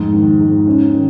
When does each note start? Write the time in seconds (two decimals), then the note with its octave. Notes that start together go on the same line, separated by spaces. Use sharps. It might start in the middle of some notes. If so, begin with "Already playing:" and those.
Already playing: F2 G#2
0.13 D#3
0.40 G#2
0.67 C#4
0.93 D#3